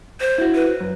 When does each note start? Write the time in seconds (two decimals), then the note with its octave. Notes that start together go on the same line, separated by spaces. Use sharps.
0.20 C5
0.38 E4 F#4
0.55 B4
0.81 F#2